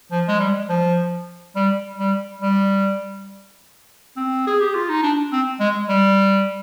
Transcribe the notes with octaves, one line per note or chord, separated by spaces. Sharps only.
F3
G#3
G3
F3
G3
G3
G3
C4
G#4
G4
F4
D#4
D4
C4
G#3
G3